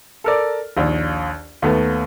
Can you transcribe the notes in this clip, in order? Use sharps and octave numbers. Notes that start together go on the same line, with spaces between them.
A4 A#4 D5
A#1 D#2
D#2 A3 B3